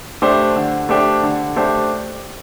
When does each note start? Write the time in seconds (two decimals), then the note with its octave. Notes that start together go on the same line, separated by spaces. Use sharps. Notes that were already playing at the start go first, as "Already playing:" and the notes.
0.22 A3 D4 G4 C5
0.56 D3
0.89 A3 D4 G4 C5
1.23 D3
1.56 A3 D4 G4 C5